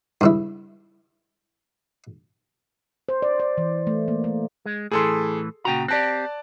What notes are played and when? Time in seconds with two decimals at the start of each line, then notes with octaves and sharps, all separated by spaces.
0.21 G2 C#3 E4
3.09 C5
3.22 D5
3.40 D5
3.58 E3
3.87 A3
4.08 A#3
4.24 A3
4.66 G#3
4.91 A2 E3 G#4 A4 C6
5.65 A#2 C#3 F#4 G5 A#5
5.88 C4 G4 D5 A5 F#6